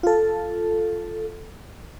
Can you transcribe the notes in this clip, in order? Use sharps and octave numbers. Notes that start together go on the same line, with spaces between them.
F4 A4